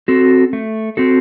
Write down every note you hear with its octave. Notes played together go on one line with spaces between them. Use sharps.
C4 F#4 A4
A3
C4 F#4 A4